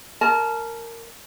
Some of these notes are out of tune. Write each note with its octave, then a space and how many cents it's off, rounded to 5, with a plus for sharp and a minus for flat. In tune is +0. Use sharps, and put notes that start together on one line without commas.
A#4 -15 A5 -35